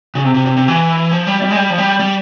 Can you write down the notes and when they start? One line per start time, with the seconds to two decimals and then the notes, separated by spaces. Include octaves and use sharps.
0.15 C#3
0.24 C3
0.34 C3
0.46 C3
0.57 C3
0.68 E3
1.12 F3
1.27 G3
1.42 G3
1.50 G#3
1.56 G3
1.70 F3
1.78 G3
1.99 G3